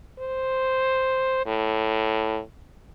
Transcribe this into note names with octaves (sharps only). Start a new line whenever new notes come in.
C5
A2